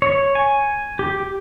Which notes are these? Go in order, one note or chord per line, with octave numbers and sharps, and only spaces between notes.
C#5
G#5
G4